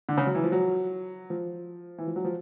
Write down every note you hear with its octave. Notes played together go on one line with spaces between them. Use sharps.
D3
C#3
F#3
E3
F3
F#3
F3
E3
F3
F#3
F3